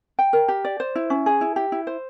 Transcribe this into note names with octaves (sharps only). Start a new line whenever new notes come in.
G5
A#4
G4
D5
C5
E4
C#4
G#4
E4
G4
E4
C5